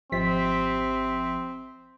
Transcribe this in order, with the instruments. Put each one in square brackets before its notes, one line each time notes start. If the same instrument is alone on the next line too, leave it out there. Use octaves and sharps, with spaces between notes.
[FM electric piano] G#1 F3 B6 [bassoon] C3 [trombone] C4